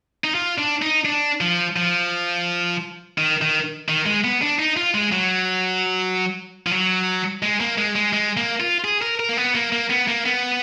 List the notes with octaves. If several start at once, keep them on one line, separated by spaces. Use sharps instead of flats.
D#4
F4
D4
D#4
D4
F3
F3
D#3
D#3
D#3
G#3
B3
D4
D#4
F4
G#3
F#3
F3
F#3
G#3
A#3
G#3
G#3
G#3
A#3
F4
G#4
A#4
A#4
A#3
B3
A#3
A#3
B3
A#3
B3